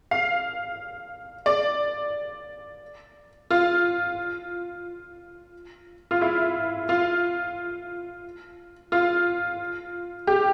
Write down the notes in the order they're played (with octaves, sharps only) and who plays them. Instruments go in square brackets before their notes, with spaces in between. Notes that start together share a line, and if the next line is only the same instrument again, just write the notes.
[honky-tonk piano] F5
D5
F4
F4
E4
F4
F4
G4